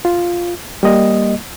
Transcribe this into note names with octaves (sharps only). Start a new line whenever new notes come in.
F4
G3 A#3 D#5